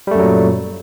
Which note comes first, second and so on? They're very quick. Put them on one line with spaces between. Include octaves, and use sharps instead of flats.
G3 A3 F#2 F#3 A#2